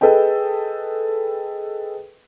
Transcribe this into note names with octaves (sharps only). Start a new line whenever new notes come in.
G#4 A4 B4 D#5 G5